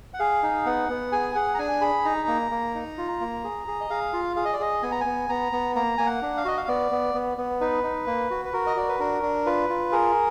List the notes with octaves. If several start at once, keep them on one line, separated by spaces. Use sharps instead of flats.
F#5
G#4 F5
D#4
B3 F#5
B3
G#4 G#5
G#4 F#5
A#5
D4 G#5
G#4 B5
D#4 A#5
A#3
A#3
D#4
F4
A#3
G#4
G#4
D#5
G#4 F5
F4
G#4 F5
D#5
D5
G#4 D#5
B3 G#5
A#5
B3 G#5
B3 A#5
B3
A#3 A#5
A#3 G#5
F#5
D4
F5
F#4 D#5
F5
B3 D5
B3
B3
B3
D#4 B4
D#4
A#3
F#4
B4
F#4 A#4
D#5
F#4 D5
B4
D4 A#4
D4
F4 B4
F4
G#4 A#4